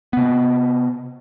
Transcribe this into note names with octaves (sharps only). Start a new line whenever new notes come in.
C3 B3